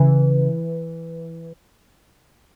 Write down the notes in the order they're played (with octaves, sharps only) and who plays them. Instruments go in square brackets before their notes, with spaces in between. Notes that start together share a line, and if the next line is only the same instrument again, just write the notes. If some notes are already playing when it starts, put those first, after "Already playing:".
Already playing: [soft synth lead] C#3 [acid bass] E3